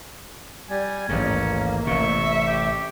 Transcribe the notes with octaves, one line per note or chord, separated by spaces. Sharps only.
G3 G#5
A1 D#2 G#2 A#3 C#4
A1 C3 E5 C#6
G4